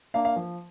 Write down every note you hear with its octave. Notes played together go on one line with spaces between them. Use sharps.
A#3 D4 F5
F5
F3